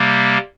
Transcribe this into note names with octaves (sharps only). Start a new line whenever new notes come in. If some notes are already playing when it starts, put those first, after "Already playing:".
Already playing: C3 G3 A#3